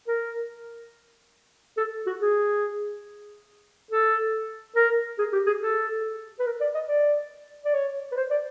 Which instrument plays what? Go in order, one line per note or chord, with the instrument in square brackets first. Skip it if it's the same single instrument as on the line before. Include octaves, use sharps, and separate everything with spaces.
[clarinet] A#4
A4
F#4
G#4
A4
A#4
G#4
G4
G#4
A4
B4
A#4
D5
D#5
D5
D5
C#5
B4
C5
D5